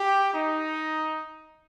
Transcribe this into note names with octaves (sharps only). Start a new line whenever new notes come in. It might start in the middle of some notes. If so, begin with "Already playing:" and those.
Already playing: G4
D#4